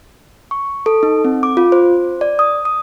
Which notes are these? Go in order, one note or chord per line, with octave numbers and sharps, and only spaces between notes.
C#6
A4
D#4
C4
D6
F4
C5
D5
D#6
D#6